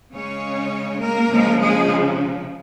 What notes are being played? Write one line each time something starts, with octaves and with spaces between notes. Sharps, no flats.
C#3 G#3 C#4 C#5
A#3 A#4
C#3 F3 G#3
G#3 G#4